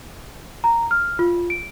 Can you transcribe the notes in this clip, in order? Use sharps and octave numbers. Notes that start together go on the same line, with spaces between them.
A#5
F6
F4
D7